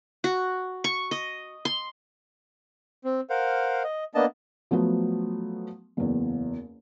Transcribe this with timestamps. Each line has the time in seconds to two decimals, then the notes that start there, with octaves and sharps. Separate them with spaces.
0.24 F#4
0.84 C#6
1.11 D#5
1.65 C6
3.04 C4
3.30 A#4 C5 F5 F#5
3.84 D#5
4.15 A#3 B3 D4 D#5 A5
4.71 F3 F#3 A3 B3
5.97 F#1 E2